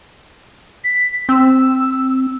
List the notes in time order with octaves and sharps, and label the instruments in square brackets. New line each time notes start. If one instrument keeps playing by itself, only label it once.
[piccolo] B6
[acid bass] C4 [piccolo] E6